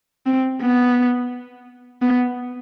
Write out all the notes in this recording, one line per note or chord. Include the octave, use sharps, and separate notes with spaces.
C4
B3
B3